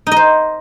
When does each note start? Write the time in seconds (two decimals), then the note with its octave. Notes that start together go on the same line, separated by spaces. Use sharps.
0.07 D#4
0.12 D#5
0.16 C5